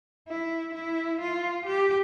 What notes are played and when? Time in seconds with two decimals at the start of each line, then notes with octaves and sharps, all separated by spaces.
0.29 E4
0.74 E4
1.21 F4
1.66 G4